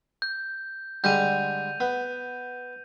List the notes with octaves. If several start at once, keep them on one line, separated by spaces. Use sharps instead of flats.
G6
D3 G3 G#3 G6 D#7 F7
B3